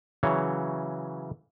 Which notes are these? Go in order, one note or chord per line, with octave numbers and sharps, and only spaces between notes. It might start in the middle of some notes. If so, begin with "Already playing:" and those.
C#3 E3 F#3 C#5